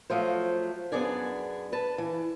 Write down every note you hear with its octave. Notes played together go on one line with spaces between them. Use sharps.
F3 F#3 A3 C5
F#2 B3 D4 G#4 D5 G#5
B4 A5
E3